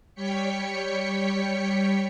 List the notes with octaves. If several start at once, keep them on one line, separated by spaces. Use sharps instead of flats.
G3 C#5 G5 B6 C#7